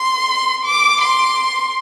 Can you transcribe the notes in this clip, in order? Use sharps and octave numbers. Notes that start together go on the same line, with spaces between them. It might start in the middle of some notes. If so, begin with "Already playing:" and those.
Already playing: C6
D6
C6